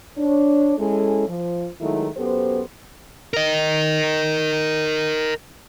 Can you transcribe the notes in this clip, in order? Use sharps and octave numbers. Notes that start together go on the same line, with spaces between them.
D4 C#5
G#3 C#4 E4 A4
F3
D#3 F#3 G#3 A3 D#4 E4
F#2 B3 G4 A4 C5
A#4 D#5